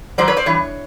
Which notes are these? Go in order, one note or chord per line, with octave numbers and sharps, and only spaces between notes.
G#2 D#3 F#3 C5 D5
B4 C#5
C5 D5
G2 E3 C#5